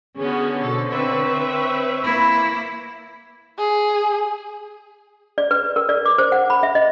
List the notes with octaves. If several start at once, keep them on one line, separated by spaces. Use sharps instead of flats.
D3 B3 C#4 F#4 G#4
B2 A4 C5 C#5 C#6
C4 B4 E5
A#3 E4 B5
G#4
D5
B4
A#4
D5
D6
C5
F#5
B5
E5
D#5